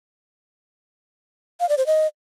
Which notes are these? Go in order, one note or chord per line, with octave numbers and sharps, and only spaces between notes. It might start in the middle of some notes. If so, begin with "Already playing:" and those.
F5
D5
C5
D#5